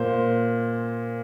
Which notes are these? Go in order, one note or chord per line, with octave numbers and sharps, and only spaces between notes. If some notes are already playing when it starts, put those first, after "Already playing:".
Already playing: A#2 A#3 C5